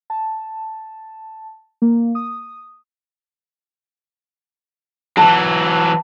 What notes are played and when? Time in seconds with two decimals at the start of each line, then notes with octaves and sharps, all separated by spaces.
0.10 A5
1.82 A#3
2.15 D#6
5.17 E3 F#3 A5